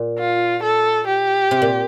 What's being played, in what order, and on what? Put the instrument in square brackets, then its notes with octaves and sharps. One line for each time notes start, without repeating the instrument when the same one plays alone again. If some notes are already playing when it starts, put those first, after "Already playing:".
Already playing: [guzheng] A#2
[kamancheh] F4
A4
G4
[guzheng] C3
A#2